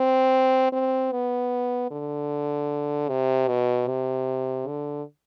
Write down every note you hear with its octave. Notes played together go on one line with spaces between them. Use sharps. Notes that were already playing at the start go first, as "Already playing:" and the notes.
Already playing: C4
C4
B3
D3
C3
B2
C3
D3